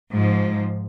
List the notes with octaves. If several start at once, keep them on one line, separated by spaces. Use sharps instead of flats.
G#2 F3